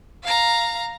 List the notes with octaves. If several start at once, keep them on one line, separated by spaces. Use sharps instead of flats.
F5 A#5